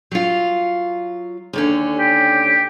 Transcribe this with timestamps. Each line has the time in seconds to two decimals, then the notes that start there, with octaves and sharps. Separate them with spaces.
0.11 F#3 F4
1.53 D#2 D3 C#4
1.98 G4